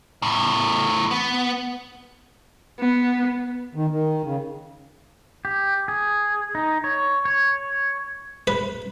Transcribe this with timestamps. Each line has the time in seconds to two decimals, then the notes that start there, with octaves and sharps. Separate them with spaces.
0.22 E2 A2
1.11 B3
2.79 B3
3.75 D#3
3.91 D#3
4.24 C#3
5.45 G4
5.88 G#4
6.55 D#4
6.84 C#5
7.25 C#5
8.47 B4